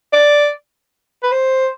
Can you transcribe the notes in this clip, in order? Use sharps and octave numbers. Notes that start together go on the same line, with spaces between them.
D5
B4
C5